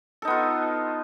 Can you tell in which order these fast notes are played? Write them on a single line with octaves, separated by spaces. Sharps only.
A4 D#4 B3 F4